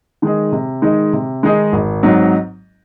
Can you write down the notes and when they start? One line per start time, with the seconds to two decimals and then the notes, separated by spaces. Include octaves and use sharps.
0.22 D#3 G#3 D#4 G#4
0.52 C3
0.82 D#3 G#3 D#4 G#4
1.13 C3
1.43 D#3 G#3 D#4 G#4
1.73 G#1
2.03 G#2 F#3 C4 D#4